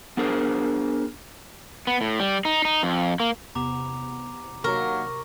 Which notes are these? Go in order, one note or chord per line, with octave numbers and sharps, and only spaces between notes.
B3 D4 G#4 A#4 C5
B3
A2
G3
D#4
D#4
F2
A#3
E2 C3 B3 A#5 D6 F7
C3 D#3 F#3 A#3 A#4 A#5 C#6